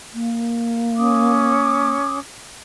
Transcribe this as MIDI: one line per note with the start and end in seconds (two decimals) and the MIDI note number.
0.13 1.92 58
0.97 2.18 61
0.97 2.18 86
0.97 2.18 87